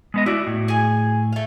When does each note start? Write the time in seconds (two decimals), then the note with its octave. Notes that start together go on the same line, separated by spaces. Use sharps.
0.14 G#3 B3 D#5
0.26 E4 F#4 D5
0.47 A2
0.68 G#4 G#5
1.32 A3 F5